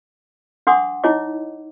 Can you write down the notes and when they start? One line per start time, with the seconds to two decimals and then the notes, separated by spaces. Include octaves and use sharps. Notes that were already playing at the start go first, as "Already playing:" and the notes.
0.67 D4 F#5 C6 D6 D#6
1.04 D#4 E4 C#5 D#5 D6